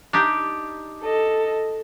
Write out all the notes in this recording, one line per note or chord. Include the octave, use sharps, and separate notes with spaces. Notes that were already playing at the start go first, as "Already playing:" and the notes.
D4 D#4 G4
A4 D#5